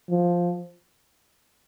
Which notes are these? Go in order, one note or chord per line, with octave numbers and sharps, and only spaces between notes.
F3